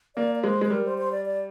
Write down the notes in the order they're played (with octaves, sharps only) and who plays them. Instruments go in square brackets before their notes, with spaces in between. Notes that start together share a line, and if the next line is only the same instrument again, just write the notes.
[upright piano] A#3 [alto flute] D5
[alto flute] D5
[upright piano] G#3 [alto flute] C5
[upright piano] G#3 [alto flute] C5
[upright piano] G3 [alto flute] A#4
[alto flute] C5
C5
D5
D5